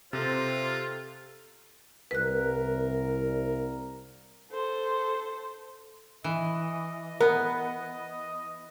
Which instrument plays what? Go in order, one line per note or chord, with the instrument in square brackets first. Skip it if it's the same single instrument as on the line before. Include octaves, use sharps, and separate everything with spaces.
[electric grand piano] C3 [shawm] F4 [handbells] A4 G6 A6 [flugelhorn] C5
[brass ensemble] C2 A#4 [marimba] B4 F#6
[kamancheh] A4 C5
[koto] E3 [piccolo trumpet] D#5
[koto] B3 [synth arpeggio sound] A#4